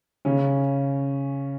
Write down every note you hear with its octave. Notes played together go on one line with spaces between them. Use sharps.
C#3 C#4